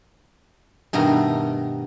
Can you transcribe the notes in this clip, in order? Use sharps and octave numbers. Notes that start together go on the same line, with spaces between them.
G2 B2 D#3 A3 A#5